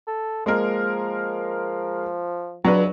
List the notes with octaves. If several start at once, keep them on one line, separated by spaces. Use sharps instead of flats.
A4
F3 G#3 A#3 A#4
C#2 F#3 D4 B4